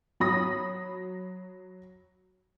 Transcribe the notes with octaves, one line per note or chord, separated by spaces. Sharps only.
F#3 B5 D#6 A#6